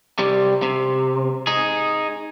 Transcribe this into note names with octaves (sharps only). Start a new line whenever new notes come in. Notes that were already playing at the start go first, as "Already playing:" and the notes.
C3 G3
C3
D#4 G#4